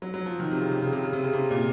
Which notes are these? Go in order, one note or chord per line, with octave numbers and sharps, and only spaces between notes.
F#3
F#3
F3
D#3
C3
C#3
C3
C#3
C3
C#3
C3
C#3
C3
A#2